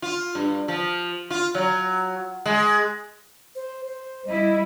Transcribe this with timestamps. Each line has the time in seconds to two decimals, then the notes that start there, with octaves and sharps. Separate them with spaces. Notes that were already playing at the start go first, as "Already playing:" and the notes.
0.02 F4
0.35 G2
0.68 F3
1.30 F4
1.55 F#3
2.46 G#3
3.55 C5
3.87 C5
4.27 G3 E4 D#5